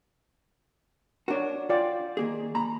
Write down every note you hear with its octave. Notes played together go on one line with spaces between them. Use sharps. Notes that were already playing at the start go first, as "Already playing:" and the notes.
D4 F#4 A#4 C#5
F4 D5 G5
D#3 A#3 G#4
A#3 A#5 B5